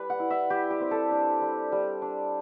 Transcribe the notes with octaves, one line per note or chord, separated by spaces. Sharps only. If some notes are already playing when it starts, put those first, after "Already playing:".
Already playing: G3 B4
F#5
E4
E5
G3 G4
G4
C4
A4
D4
G3
G3
D4